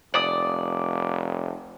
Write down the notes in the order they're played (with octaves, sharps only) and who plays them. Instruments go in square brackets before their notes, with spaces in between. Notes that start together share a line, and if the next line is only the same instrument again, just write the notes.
[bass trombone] F1 [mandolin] D5 D#6